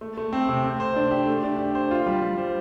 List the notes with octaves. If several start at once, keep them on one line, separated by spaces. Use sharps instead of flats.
A3
A3
C4
C3
A3
C5
D4
G4
A3
D4
G4
C5
F4
G3
G3
C5